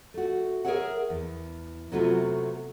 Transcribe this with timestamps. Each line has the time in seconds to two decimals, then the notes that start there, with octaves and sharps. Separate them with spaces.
0.14 A3 F#4
0.65 G#4 A#4 B4 C#5 E5 F#5
1.10 E2
1.92 C3 F#3 A3 B3 F4 F#4